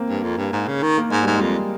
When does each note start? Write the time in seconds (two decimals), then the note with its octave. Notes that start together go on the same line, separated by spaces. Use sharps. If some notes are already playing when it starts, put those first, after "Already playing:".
Already playing: A#3 C4
0.09 G2
0.23 F2
0.38 G2
0.53 G#2
0.67 C#3
0.82 D#3
0.98 A#3
1.10 G#2 G#3
1.22 G#2 G3
1.35 G#3
1.41 F2